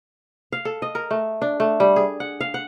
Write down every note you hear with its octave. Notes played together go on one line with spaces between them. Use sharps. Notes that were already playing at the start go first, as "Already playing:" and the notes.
F5
A4
D#5
A#4
A3
D4
A3
G3
G#4
F#5
F5
F#5